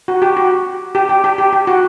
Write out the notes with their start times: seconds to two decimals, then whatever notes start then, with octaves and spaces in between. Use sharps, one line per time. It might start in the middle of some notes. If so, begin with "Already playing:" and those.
0.08 F#4
0.22 G4
0.37 F#4
0.95 G4
1.09 G4
1.24 G4
1.38 G4
1.53 G4
1.67 F#4